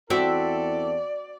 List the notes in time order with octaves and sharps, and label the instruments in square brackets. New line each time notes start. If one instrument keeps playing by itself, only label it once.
[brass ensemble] E2 E4 A4 [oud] C4 [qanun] F#4 E5 D6 [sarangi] D5